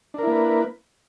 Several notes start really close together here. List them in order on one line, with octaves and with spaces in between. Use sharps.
D4 A#4 E4 A#3 B4